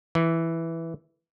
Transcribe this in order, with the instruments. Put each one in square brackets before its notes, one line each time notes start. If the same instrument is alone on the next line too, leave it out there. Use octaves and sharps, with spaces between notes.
[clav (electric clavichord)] E3